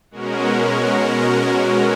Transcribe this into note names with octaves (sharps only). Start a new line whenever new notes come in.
B2 G#3 C#4 F#4 A#4